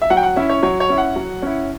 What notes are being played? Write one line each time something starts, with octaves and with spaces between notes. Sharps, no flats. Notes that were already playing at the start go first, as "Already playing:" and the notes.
E5
F#3 F#5
G5
F#5
C#4 E4 E5
C#5
F#3 C#5
C#5
C#4 E4
F#5
F#3
C#4 E4